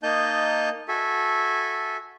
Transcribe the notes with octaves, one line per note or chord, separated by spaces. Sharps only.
A#3 D#4 D#5 A5 G6
F#4 A4 E5 G#5